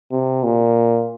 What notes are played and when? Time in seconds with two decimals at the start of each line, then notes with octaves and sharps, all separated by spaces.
0.12 C3
0.44 A#2